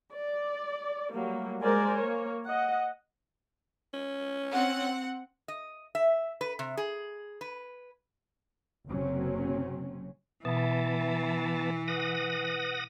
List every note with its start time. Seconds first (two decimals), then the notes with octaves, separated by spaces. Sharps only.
0.13 D5
1.13 F#3 G3 A3 A#3
1.62 G#3 A#4 C5 D5 G#5
1.99 A#3 C#5
2.45 D#5 F#5
3.94 C#4
4.51 C4 F#5
5.48 D#5
5.95 E5
6.41 B4
6.59 C3
6.77 G#4
7.41 B4
8.87 F#1 C3 F#3 C4 C#4
10.45 B2 E3 B3 E5 A5
11.88 B4 F#5 D#6 A#6